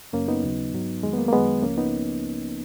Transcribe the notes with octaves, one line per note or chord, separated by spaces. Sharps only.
F#2 C#3 F#3 A#3 C#4
B3 D#4
D#2 C#3 F#3
G#2 F#3
F2 D#3 F#3 G#3
B3
A#3
A#3
F#2 D#3 F#3 G#3 B3
C#2 C#3 F3 A#3 C#4
B3 D#4